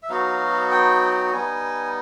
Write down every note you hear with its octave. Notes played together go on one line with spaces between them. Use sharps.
E5
F#3 B3 D#4 F#4 F5
G5
G3 B3 D#4 G#5